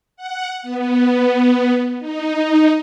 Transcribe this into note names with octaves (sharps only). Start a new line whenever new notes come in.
F#5
B3
D#4